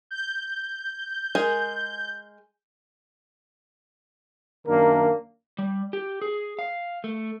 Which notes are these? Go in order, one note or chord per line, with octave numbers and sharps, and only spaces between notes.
G6
G#3 G#4 A#4
F#2 D#3 A#3 D4 A#4
G3
G4
G#4
F5
A3